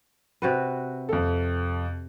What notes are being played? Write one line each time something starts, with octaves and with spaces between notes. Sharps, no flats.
C3 F#4 B4
F2 A4